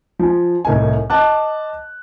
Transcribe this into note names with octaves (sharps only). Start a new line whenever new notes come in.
F3 G#5
C2 A2 A#4 D#5 G#5
D#5 A5 D6 F#6